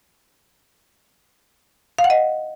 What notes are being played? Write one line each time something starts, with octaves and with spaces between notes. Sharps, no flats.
F5
F#5
D#5